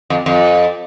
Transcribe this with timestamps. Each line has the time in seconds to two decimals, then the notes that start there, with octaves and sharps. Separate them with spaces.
0.10 F2
0.26 F2